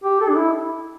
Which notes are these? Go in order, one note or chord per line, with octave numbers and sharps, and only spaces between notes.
G4
A4
D4
E4